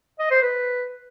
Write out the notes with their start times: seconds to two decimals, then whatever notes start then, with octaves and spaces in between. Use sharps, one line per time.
0.20 D#5
0.31 C5
0.42 B4